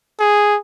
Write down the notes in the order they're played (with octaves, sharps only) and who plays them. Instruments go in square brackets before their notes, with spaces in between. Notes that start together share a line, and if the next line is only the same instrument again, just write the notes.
[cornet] G#4